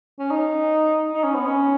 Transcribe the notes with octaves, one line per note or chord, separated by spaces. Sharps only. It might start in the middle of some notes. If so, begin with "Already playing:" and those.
C#4
D#4
D#4
C#4
B3
C#4